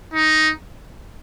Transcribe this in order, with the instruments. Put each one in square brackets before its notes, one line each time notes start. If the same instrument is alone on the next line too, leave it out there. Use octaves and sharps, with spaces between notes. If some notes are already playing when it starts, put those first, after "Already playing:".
[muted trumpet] D#4